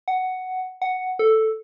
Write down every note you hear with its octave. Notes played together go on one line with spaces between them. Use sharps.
F#5
F#5
A4